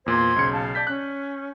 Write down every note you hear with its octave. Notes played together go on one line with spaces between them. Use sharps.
E2 A#2 C5 C6 G#6
B1 C#3 C#7
F5 A5
D5 G6 B6
C#4 F#6